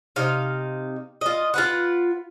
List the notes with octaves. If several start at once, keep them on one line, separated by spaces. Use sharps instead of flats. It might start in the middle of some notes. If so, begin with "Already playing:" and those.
C3 D#4 F5
F4 D#5
F4 B4 F#5